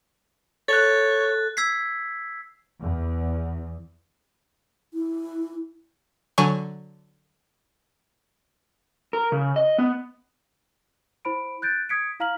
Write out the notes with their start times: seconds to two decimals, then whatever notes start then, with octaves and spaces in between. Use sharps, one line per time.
0.68 A4 C#5 F#6 A6
1.57 E6 G#6 B6 C7
2.81 E2
4.94 E4
6.38 D3 F#3 G#5 C#6
9.13 A#4
9.32 C#3
9.56 D#5
9.78 B3
11.25 E4 C5 B5 D7
11.62 F#6 G6 A6 D7
11.89 D#6 G#6 B6 C#7 D7
12.20 E4 F5 A#5 F6 B6 F#7